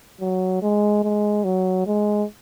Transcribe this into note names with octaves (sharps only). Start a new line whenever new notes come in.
F#3
G#3
G#3
F#3
G#3